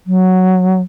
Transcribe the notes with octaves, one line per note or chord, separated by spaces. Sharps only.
F#3